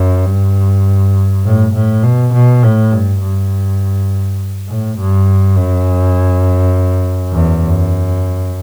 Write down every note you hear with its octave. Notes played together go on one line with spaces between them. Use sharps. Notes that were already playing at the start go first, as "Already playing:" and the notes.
Already playing: F#2
G2
A2
A2
B2
B2
A2
G2
G2
A2
G2
F#2
E2
F#2